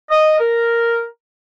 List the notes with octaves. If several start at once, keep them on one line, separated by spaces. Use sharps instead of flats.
D#5
A#4